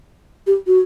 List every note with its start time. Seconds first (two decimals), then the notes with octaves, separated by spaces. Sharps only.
0.47 G4
0.67 F#4